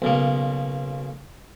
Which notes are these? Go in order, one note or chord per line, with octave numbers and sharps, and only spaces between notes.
B1 C#3 A#3